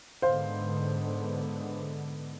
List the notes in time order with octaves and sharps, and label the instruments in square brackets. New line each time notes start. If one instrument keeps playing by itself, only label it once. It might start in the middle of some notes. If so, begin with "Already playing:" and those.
[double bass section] G#2 D3 B3 [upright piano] C5 F5